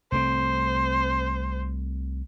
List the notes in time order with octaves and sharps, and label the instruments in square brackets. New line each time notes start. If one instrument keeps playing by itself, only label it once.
[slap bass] C2 A3 C4 [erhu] C5